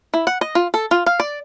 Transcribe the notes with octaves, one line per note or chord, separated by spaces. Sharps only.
E4
F#5
D#5
F4
A4
F4
F5
D5